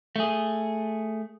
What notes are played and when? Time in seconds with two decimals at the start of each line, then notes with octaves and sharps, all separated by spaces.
0.16 A3 G#4